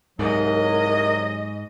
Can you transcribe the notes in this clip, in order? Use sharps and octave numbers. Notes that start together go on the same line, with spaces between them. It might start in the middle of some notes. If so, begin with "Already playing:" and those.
C2 G#2 F#3 A#4 D#5